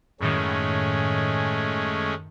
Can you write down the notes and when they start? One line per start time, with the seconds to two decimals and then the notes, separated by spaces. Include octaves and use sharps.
0.20 F#2 A2 D#3 G#3 A3 C#4